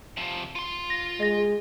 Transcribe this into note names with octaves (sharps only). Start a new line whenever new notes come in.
C3 F3
F4 C6
A#6
G#3 D#5 A#6